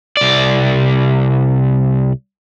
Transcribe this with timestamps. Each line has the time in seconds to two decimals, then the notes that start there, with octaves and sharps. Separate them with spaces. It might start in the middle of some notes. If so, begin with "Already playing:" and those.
0.17 C2 D5